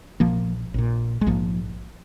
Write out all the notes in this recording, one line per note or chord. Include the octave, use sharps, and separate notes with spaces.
A#1 A#2 F3 A#3
A#1 A#2
G#3
A#1 G#2 F3 A#3